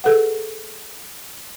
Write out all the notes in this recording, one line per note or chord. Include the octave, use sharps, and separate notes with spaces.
G#4 A4 B4 F#5